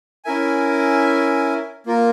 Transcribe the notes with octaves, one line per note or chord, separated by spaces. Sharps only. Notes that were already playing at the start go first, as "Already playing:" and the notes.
C#4 E4 A#4 E5 G#5
A#3 F4 A#4